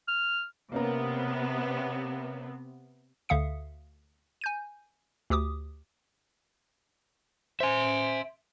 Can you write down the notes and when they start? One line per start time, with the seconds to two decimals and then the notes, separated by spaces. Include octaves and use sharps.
0.08 F6
0.72 C3 A#3 B3 C#4 A#4
3.29 D2 D3 E5 F5 D#6 C#7
4.41 G#5 G6 D#7
5.30 D2 G4 D6 D#6
7.60 C5 E5 G#5 C6